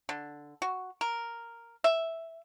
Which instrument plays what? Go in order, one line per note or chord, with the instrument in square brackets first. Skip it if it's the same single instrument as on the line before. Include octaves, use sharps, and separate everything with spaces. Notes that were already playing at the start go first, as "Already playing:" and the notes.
[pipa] D3
F#4
A#4
E5